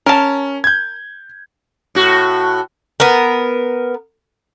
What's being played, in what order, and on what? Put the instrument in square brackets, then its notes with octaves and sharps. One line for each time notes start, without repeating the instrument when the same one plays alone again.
[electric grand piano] C#4 [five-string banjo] A#4 A5
[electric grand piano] G6 G#6
[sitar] A2 F#4
[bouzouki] B3 A#4